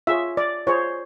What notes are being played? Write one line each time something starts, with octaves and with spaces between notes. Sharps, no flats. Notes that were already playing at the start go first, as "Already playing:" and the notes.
F4 G#4 C#5 E5
D5
F4 G#4 C5 C#5